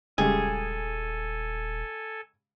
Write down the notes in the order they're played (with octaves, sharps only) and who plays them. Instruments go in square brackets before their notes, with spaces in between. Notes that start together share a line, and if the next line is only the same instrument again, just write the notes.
[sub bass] D#1 [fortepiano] C#3 G3 G#3 [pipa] G#4 [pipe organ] A4 G#5